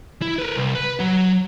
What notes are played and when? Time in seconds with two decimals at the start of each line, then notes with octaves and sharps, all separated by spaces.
0.22 E4
0.39 A#4 B4
0.56 C2
0.75 B4
1.00 F#3 F#5